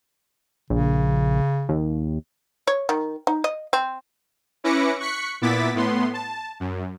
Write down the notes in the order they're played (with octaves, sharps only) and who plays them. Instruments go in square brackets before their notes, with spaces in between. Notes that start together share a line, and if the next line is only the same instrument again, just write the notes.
[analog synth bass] A#1 [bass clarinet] C#3
[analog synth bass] D#2
[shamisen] C#5
D#3
D#4
D#5
C4
[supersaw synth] C#4 E4 B4 D6 A#6 C#7
C#6 F#6 B6 C#7
A#2 B3 E4 D6 A6 B6
A2 B3 C6
A5
F#2